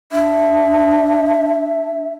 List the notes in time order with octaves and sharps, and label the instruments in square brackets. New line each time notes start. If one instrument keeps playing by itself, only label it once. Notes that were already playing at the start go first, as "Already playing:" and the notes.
[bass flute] D4 [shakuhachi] E5